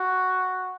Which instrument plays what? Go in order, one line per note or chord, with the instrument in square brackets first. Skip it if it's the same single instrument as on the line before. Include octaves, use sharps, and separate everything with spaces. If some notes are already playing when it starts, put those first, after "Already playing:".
Already playing: [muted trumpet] F#4